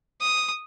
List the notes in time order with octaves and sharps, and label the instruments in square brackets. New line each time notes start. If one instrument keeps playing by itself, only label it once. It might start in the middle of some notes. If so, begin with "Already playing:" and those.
[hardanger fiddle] D#6